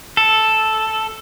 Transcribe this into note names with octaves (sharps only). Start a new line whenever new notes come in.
A4